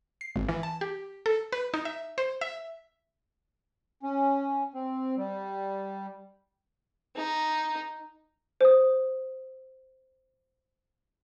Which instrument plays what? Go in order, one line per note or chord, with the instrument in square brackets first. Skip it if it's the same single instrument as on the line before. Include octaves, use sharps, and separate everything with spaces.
[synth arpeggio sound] C7
G#1
E3
A5
G4
A4
B4
D#4
E5
C5
E5
[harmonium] C#4
C4
G3
[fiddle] D#4
[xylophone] C5 D#6